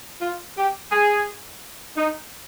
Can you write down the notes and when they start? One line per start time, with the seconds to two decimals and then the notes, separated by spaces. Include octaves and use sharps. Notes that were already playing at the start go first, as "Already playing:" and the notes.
0.22 F4
0.57 G4
0.91 G#4
1.97 D#4